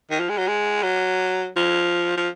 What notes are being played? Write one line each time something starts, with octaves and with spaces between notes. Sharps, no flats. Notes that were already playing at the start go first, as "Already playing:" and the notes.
D#3
F3
G#3
F#3
G#3
F#3
F3
F3